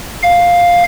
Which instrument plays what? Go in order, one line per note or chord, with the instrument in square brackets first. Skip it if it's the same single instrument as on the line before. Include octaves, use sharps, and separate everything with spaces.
[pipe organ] F5